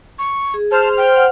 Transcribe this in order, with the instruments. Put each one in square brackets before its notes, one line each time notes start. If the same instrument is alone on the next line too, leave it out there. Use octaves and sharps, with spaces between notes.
[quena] C#6
[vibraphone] G#4
[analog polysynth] C5 F6 [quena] A5
[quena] G5
[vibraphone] F#5